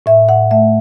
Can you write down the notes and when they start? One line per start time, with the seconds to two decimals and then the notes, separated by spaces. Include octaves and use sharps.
0.06 A2 E5
0.29 A2 F#5
0.51 A3 E5